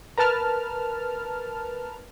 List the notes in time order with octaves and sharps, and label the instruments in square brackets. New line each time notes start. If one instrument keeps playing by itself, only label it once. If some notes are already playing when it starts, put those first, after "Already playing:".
[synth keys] A#4 B4 A5 F6